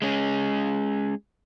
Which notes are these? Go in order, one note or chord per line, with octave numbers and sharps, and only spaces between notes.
G#3 C#4